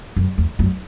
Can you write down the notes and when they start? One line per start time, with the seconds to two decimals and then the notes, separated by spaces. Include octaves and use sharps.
0.16 F#2
0.38 E2
0.59 F#2